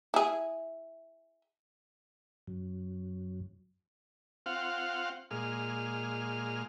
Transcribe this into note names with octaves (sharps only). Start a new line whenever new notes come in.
E4 G#4
F#2
C4 F4 F5 F#5
A#2 G#3 F6